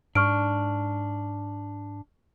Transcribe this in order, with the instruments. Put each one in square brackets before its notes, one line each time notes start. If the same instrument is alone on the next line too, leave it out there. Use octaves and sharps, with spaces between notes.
[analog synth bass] G#2 [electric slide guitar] D4 [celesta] C#6 F6 D7